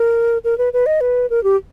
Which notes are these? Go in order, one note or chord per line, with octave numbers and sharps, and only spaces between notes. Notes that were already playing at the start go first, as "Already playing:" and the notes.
Already playing: A#4
A#4
B4
B4
D#5
B4
A#4
G4